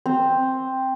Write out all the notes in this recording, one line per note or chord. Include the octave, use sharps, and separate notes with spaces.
C4